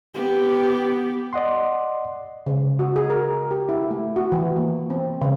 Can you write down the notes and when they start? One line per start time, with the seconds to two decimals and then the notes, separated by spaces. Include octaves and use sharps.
0.14 B3 G4
1.33 D5 D#5 F#5 C6
2.46 C#3
2.79 F#4
2.96 G#4
3.10 A#4
3.51 G4
3.69 E4
3.91 A3
4.16 F#4
4.32 E3
4.56 A#3
4.90 C4
5.21 C#3